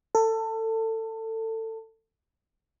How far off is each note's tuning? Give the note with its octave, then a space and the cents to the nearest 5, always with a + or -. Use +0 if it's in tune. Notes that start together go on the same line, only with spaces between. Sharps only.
A4 +25